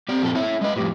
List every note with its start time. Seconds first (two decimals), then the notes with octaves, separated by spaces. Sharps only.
0.09 A#3 C4 G4 D5
0.22 F2 A#2 A4
0.35 E4 C#5 E5
0.49 C#4
0.61 G#3 B4 D#5
0.76 F2 A2 G4